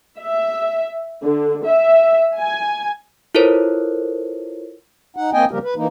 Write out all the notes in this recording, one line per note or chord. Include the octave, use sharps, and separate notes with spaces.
E5
D3
E5
G#5
E4 F4 A4 A#4 C5 C#5
D#4 F#5
A#3 C4 D#5 G5 G#5
C#3 F3 G3 A#3 G4 A#4
B4
E3 A#3 D#4